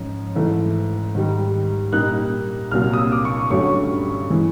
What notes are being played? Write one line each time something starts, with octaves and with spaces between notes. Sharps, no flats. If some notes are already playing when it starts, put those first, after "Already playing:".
Already playing: G#2 F3 C#4
G#2 E3 A3
G#2 D#3 G3
A#2 G3 A#3 D#4 F#6
C2 A#2 F#3 A#3 F6
D#6
E6
D6
C#6
G2 D3 F#3 A3 C#4 C#6
E3 G#3